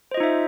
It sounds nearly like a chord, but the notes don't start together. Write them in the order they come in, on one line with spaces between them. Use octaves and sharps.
C5 D#5 F4 D#4 E5